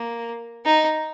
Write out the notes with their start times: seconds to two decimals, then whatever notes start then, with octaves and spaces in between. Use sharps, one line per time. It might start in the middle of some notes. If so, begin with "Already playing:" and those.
Already playing: A#3
0.65 D#4